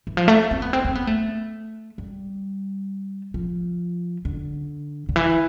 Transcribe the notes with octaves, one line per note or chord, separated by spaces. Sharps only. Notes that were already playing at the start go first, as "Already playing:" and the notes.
E3
F3
A3
C4
B3
C4
C4
B3
A3
G3
F3
D3
D3
E3